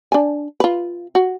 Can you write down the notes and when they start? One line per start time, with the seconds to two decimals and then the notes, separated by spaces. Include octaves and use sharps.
0.12 D4 G#5
0.60 F4 B4
1.15 F#4